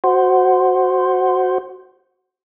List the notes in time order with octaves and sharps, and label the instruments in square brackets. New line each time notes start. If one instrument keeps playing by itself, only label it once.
[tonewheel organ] F#4 C5